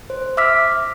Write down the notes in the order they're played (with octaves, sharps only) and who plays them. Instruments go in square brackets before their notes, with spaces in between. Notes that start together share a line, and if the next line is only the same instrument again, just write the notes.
[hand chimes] C5
E5 D6 E6 F6 B6